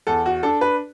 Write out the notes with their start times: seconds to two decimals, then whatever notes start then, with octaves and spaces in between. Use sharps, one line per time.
0.07 E2 A4
0.26 F#4
0.43 D4 A4
0.61 B4